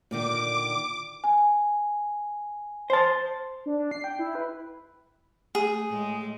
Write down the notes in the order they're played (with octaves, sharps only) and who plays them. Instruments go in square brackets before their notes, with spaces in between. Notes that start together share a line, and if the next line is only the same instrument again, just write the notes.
[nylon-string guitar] A#2 D3 D#3 [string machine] D6
[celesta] G#5
[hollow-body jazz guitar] C5 A5
[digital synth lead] D4
D4
C7
G5
E4
B4
[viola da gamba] A3 [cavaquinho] G#4
[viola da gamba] A2 G#3